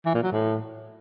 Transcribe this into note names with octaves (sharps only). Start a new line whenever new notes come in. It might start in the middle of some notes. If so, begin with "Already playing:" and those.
E3
A#2
F#3
A2